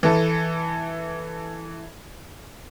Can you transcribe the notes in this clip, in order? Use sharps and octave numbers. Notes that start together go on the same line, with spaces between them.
E3 A4